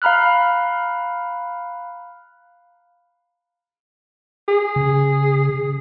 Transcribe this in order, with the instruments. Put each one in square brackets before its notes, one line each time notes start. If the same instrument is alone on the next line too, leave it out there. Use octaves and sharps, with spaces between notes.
[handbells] F5 A#5 B5 F6 F#6
[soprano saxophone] G#4
[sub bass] C#3